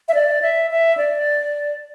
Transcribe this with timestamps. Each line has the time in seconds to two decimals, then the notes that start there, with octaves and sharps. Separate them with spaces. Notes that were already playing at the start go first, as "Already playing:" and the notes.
0.08 E5
0.14 D5
0.42 E5
0.71 E5
0.97 D5